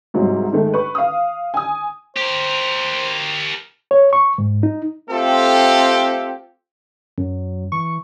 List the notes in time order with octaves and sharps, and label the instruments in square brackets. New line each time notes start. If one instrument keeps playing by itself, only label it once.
[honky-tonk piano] C2 G#2 F#3 G#3
D#3 G#3 A3
B4 C#6
F5 D#6
G#5 D#6
[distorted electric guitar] G4 A#4 [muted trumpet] C5
[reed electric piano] C#5
C#6
G#2
D#4
[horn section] A3 C4 F4 G4 A4
[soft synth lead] F#2 [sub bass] F#3
[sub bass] E3 [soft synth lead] C#6